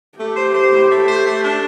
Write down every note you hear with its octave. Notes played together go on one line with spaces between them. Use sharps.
A3 G4
C5
C5
A2
A3
C5
A3
D4